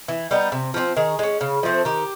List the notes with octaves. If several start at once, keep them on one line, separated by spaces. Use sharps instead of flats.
E3
G3 B3 D#4
C3
F3 A3 C4
D#3 G#4
G#3 C#4
C#3
F3 A3 C4
D#3 G4